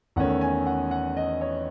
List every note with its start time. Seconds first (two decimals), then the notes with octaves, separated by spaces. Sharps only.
0.16 E2 D#3 A3 C#4 F#5
0.41 G#5
0.66 F#5
0.91 F#5
1.17 D#5
1.41 C#5